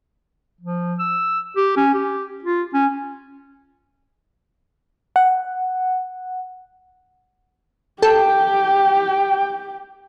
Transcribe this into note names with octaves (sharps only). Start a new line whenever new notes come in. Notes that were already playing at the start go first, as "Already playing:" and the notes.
F3
E6
G4
C#4
G4
F4
C#4
F#5
G4 A4 G5